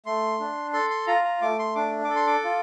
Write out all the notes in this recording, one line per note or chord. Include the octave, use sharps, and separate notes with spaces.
A3 C6
D4
A4 C6
C6
F4 A#5
A#5
A3 D6
C6
D4 D6
A4 D6
C6
D6
F4